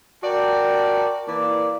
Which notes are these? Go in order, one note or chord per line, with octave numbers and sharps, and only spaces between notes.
F#4 A#4 D5 G5 A5
E3 A#3 D5